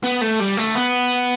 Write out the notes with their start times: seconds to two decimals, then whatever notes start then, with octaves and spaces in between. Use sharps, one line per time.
0.03 B3
0.21 A3
0.40 G3
0.57 A3
0.75 B3